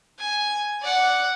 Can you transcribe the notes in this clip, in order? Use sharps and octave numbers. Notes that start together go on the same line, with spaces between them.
G#5
D5 F#5